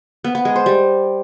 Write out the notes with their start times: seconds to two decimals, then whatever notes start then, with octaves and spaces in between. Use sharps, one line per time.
0.24 B3
0.35 B3
0.45 G#3
0.56 C5
0.66 G3